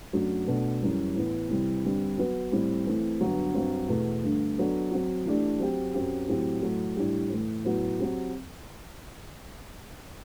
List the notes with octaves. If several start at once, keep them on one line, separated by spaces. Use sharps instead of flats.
F#2 F#3 A3 D4 F#4
B2 A3 D4 A4
F#2 E3 G3
A2 E3 B3
C3 E3 G3
G2 D3 G3 C4
F#3 B3 F#4 B4
A2 G3 C4
E3 A3 C4
G2 D3 F#3 B3
G2 F#3 C4
E2 B2 A3
G2 D3 A3
F#3 B3 D4 A4
F#3 C4 F#4
E3 A3 D4 G4
F#3 C4 G4
F#2 F#3 C4 G4
A2 F#3 C4 G4
A2 F#3 A3
A2 G3 D4 G4
A2 E3 A3
A2 F#3 B3 F#4
F#3 C4 G4